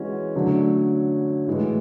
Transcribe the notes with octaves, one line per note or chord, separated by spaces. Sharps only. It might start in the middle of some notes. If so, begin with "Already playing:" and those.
Already playing: E3 G#3 C#4 F#4
D3 F#3 A3 C#4
A2 E3 G#3